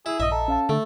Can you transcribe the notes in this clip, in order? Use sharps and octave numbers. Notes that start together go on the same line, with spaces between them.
E4 G#4
A#1 G2 D#5 E5 D#6
A4 D#5 A#5
C#4 F5 A5
D3 A3